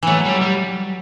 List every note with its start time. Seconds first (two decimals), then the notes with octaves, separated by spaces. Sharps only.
0.03 E3 F#3 A3
0.25 G3
0.41 G3